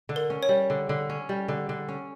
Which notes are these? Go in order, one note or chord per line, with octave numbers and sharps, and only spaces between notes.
D3
A#4
C#4
C#5
G3
D3
D3
C#4
G3
D3
D3
C#4